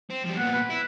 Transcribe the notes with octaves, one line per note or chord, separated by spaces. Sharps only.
C4
F3 G3
A#2 B3 F#5
B4
E4